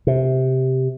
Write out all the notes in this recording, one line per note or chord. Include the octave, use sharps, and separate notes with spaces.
C3